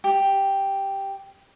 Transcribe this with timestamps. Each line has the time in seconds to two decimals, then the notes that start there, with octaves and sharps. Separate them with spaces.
0.04 G4